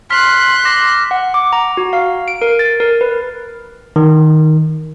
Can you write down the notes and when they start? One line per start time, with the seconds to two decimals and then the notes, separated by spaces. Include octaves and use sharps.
0.10 C6 F6 F#6 B6
0.65 D6 A#6
1.11 F#5
1.34 D6
1.53 A#5
1.77 F#4
1.93 F5
2.28 D7
2.42 A#4
2.59 A6
2.80 A#4
3.01 B4
3.96 D#3